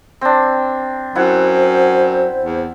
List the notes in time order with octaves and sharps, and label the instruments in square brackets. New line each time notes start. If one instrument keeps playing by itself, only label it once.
[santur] C4 D4
[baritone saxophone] F#2 [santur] E4 F#5 [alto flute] C5
[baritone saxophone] E2